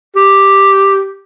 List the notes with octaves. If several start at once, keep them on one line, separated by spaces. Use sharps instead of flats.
G4